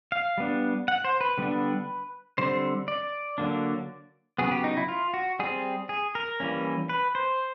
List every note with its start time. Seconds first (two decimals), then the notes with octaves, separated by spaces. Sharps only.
0.12 F5
0.38 G3 B3 D4
0.88 F#5
1.04 C5
1.21 B4
1.38 D3 G3 B3 D4
2.38 D3 G3 C4 C5
2.88 D5
3.38 D3 F#3 A#3 D4
4.38 C#3 F#3 B3 G#4
4.52 G4
4.64 D#4
4.77 E4
4.89 F4
5.14 F#4
5.39 G3 C4 G#4
5.89 G#4
6.15 A#4
6.40 E3 G3 A#3 C#4
6.89 B4
7.15 C5